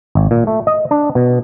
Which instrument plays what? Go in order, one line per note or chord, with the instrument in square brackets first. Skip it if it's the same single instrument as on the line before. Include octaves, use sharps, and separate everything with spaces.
[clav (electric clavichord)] G#1
A#2
A3
D#5
D4
B2